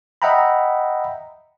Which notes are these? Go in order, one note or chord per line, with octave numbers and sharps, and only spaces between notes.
D#5 E5 F#5 G5 A#5 B5